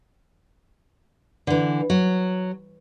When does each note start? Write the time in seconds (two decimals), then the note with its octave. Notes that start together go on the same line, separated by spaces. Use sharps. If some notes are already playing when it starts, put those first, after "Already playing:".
1.47 D3 E3
1.90 F#3